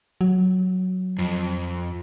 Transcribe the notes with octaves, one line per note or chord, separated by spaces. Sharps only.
F#3
F2